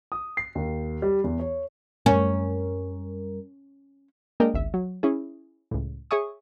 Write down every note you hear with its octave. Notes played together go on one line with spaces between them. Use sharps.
D#6
C7
D#2
G3
E2
C#5
F#2 G3 C#4 A#4
G#3 A#3 D4 A#4 D#5 G5
G#1 C#2 E5
F#3
C#4 E4 G#4
C#2 A2
G#4 C#5 E5 G#5 C#6 D#6